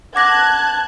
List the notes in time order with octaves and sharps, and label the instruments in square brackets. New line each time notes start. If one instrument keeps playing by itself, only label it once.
[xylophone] F#5 D6 A#6 [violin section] A5 F#6 G#6